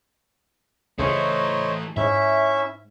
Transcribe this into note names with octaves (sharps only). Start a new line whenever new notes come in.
C#2 E3 A3 C5 C#5 D#5
G#2 C#4 E4 E5